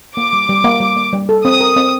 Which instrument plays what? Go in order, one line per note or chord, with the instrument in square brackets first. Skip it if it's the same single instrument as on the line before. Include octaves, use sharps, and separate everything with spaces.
[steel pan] A#3 [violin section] D6
[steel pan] G3
G3
A#3
G3
A#3
G3
A4
[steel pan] C4 [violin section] D#6
[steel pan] A#4
C4